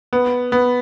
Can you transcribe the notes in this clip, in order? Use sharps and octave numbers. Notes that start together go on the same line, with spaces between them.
B3
B3